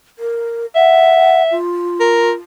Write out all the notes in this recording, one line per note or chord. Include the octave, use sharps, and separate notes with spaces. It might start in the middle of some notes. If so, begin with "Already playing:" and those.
A#4
E5 F#5
F4
A#4